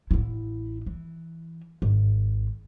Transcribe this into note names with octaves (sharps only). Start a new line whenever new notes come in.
A1 E4
E3
G#1